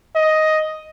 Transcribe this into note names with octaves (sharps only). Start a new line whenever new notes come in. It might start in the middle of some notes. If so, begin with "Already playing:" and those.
D#5